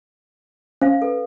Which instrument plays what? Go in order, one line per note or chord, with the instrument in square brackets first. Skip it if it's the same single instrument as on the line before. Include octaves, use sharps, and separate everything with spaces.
[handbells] C#4 [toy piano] C5 F5
[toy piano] A4 B4